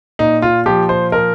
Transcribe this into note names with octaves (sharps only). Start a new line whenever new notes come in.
A#2 D#4
F4
F3 G4
C5
F3 A#4